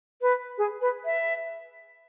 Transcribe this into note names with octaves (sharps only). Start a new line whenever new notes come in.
B4
G#4
B4
E5